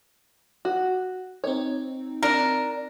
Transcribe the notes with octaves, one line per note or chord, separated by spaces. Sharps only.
F#4
C4 D#4 C#5
D4 A#4